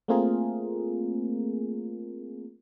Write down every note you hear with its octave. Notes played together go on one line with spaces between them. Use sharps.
A3 A#3 C4 F4 G#4 A#4